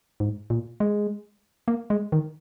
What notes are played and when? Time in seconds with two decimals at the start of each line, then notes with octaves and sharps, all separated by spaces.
0.20 G#2
0.50 A#2
0.80 G#3
1.68 A#3
1.90 G#3
2.12 D#3